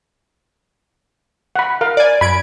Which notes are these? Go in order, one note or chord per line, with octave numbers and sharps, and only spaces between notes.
F#5 B5
A#4 F5
D5 G#5
F#2 B5 G#6 D7